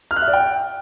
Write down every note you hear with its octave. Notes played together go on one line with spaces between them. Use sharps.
F6
F#6
E5
D5
G5